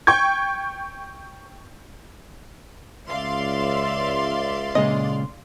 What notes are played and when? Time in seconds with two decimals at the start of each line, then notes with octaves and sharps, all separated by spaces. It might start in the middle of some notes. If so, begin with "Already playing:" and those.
0.07 G5 C#6 G6 G#6
3.08 C#2 D5 E5 F5 C6
4.75 A#2 C#3 G#3 D#5